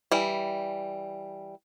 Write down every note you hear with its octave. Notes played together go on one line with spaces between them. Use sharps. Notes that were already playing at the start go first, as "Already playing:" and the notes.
E3 G3